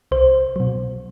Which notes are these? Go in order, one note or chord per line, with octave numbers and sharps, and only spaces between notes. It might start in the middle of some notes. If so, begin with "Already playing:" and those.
C2 C5
B2 F#3